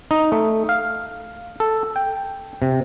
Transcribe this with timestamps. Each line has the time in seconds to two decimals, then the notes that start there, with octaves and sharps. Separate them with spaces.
0.11 D#4
0.32 A3
0.69 F5
1.60 A4
1.96 G5
2.62 C3